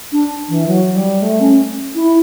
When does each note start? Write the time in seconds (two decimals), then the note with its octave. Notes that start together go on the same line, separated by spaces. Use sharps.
0.12 D4
0.48 E3
0.67 F#3
0.94 G3
1.21 A3
1.40 C#4
1.95 E4